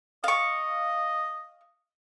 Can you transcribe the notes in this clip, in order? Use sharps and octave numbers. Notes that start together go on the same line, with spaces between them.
D#5 F5 C#6